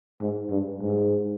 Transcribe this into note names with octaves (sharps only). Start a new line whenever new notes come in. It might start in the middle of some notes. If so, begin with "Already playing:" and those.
G#2
G2
G#2